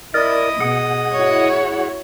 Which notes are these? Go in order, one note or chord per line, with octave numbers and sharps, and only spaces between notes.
E4 A#4 D5 D#5 D#6
B2 G#4 F#5
E4 F#4 C#5